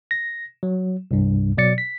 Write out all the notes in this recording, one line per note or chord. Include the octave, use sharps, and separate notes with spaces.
A#6
F#3
C2 G2
B2 F#3 D5 A6 C#7
B6